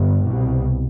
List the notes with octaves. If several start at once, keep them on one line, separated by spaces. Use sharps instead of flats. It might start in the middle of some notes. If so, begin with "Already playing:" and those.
Already playing: G1 G2
C2 B2